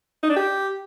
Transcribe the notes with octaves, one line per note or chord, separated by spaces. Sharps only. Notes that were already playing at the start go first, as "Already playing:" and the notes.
D#4
D4
G4